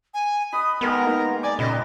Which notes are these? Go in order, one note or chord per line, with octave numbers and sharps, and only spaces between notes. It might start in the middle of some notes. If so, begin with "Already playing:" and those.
G#5
B4 D#5 B5 D#6
D#3 G#3 B3 G4 A#4
A#3 D#4
D5 G#5 D6
A#2 C#3 B4 D5 D#5